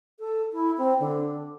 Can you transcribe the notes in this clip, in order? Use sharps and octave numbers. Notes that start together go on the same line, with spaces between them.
A4
E4
C4
D3